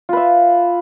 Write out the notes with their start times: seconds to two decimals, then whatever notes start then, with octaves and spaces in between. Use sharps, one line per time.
0.09 F4
0.13 B4
0.17 E5